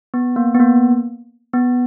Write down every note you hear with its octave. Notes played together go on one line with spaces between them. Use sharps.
B3
A#3
B3
A#3
B3